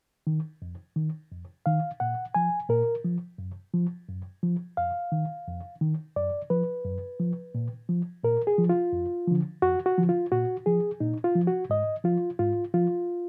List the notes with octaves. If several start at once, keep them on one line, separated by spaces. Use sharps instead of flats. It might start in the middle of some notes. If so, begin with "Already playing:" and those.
D#3
F2
D#3
F2
D#3 F5
A#2 F#5
F3 G#5
A#2 A#4
F3
F#2
F3
F#2
F3
F2 F5
D#3
F2
D#3
F#2 D5
F3 B4
F#2
F3
A#2
F3
A#2 A#4
G#4
F3
F4
F2
D3 F3
F2 F#4
F#4
D3 F3
F4
A#2 F#4
F3 G#4
A#2 D#4
F4
F3
F#4
G#2 D#5
F3 F4
G#2 F4
F3 F4